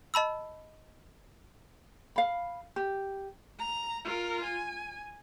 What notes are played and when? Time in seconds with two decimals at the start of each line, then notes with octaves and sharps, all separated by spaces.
0.14 D#5 A5 B5 E6
2.16 F5 B5
2.76 G4
3.59 A#5
4.05 F4 A#4
4.44 G#5